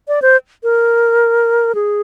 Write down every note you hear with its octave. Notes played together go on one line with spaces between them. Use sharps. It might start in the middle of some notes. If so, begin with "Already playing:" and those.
D5
C5
A#4
G#4